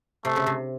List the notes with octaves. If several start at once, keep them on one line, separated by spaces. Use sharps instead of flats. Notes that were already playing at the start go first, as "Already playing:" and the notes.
C3 A3
C#3
C3